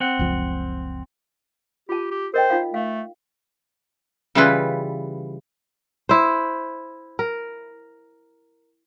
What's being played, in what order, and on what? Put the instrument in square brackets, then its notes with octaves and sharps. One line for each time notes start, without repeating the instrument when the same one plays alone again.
[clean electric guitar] C4 F#5
[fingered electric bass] F#1 C#2 F3
[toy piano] F4 A5 [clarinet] G4
[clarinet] G4
[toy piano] A#4 D#5 G5 [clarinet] C5
[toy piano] D#4 F4 F5
[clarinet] A3 [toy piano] F5
[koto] C#3 E3 G3 E4 F4 B4
[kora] E4 C5
A#4